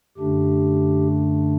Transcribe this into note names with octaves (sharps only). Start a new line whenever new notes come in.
F#2 D3 A3 D4 G4